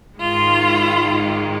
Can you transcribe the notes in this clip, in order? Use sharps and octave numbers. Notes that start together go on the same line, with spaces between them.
G#2 D#3 G#3 F4